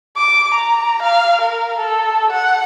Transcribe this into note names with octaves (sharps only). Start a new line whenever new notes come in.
D6
A#5
F5
A#4
A4
F#5